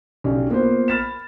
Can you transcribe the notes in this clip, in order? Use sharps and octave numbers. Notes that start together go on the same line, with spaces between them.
B1 C#4 D4 G4
A#3 B3 F4 B4 C5
B5 F6 A6 B6 E7